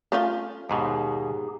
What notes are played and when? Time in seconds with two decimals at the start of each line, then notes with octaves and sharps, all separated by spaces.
0.12 A3 C#4 F4
0.70 D#2 G#2 B2 D#4 G4 G#4